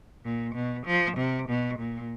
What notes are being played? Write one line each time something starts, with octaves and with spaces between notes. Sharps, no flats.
A#2
B2
F3
C3
B2
A#2